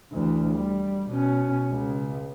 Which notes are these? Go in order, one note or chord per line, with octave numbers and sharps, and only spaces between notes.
D2 E3
G3
B2 C#4
C#2